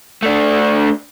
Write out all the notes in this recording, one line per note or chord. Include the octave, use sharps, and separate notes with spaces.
A3 D4